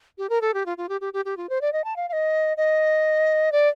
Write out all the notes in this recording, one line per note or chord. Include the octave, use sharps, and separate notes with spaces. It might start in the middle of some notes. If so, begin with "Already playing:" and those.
G4
A#4
A4
G4
F4
F4
G4
G4
G4
G4
F4
C5
D5
D#5
A5
F5
F5
D#5
D#5
D5